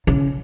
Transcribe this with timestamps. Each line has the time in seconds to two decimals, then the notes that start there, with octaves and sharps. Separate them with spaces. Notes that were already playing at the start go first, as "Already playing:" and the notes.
0.07 C#3